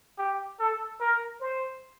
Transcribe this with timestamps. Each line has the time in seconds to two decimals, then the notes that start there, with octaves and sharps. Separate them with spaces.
0.18 G4
0.60 A4
1.00 A#4
1.40 C5